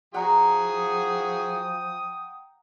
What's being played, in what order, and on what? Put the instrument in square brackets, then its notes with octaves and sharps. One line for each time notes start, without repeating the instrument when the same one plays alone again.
[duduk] F3 [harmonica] F#4 G#4 [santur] F#5 A#5 [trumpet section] G5 D#6